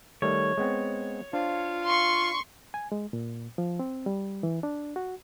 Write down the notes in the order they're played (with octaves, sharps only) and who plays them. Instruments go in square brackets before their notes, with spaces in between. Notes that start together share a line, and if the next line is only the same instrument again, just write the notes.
[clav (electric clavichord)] D#3 G3 A3 [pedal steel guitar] C#5
[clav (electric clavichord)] G#3 B3 C4
[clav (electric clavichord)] D4 C5 [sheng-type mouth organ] F4 F5
[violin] C6 C#6
[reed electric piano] G#5
G#3
A#2
F3
C4
G3
E3
D4
F#4